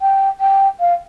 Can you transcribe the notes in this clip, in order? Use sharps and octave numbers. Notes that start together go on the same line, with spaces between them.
G5
G5
F5